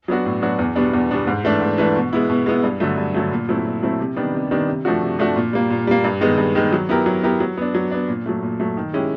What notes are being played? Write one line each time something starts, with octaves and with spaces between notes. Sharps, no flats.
F#3 B3 D4 F#4
A2
F#3 B3 D4 F#4
E2
B2 G3 B3 D4
E2
B2 G3 B3 D4
G#2
E3 A3 D4
G#2
E3 A3 D4
B2
G#3 B3 E4
B2
G#3 B3 E4
G2
D3 F#3 A3
G2
D3 F#3 A3
A#2
F#3 A3 C4 E4
A#2
F#3 A3 C4 E4
C3
D#3 G3 B3 D4
C3
D#3 G3 B3 D4
C3
F3 A3 D4 F#4
C3
F3 A3 D4 F#4
A#2
G3 A#3
A#2
G3 A#3
G2
D#3 G#3 B3
G2
D#3 G#3 B3
F#3
B3 E4 G4 A#4
F#3
B3 E4 G4 A#4
F#3
B3 D4
F#3
B3 D4
A#2
F#3 A3
A#2
F#3 A3
D#3
G#3 C#4 E4 G4